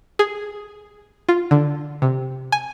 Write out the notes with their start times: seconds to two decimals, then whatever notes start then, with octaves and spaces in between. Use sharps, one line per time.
0.19 G#4
1.29 F4
1.51 D3
2.02 C3
2.52 G#5